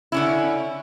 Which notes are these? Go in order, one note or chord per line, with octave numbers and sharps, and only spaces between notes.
D3 C#4 E4